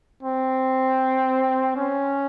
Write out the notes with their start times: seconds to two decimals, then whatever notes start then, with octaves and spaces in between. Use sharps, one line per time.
0.23 C4
1.76 C#4